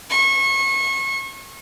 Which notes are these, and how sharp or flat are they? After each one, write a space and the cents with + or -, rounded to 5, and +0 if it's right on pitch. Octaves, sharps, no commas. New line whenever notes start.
C#6 -30